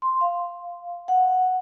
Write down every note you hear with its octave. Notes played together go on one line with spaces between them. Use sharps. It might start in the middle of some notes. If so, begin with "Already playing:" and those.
C6
F5
F#5